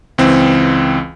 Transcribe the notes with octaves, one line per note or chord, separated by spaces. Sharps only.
C#2 E3 C4